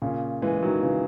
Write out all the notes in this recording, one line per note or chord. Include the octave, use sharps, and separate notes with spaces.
A#2 C#3
E3 G#3
D#3 F#3
C#3 E3